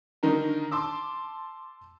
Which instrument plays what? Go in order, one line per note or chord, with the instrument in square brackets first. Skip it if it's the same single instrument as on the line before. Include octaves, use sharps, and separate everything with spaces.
[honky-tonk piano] D3 D#3 D#4 A#4
A5 C6 D6 E6